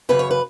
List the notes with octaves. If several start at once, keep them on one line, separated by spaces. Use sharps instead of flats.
F#2 C#3 E3 B4
C#5
B4